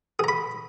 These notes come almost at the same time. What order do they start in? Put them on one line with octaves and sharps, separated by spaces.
G#4 A#5 B5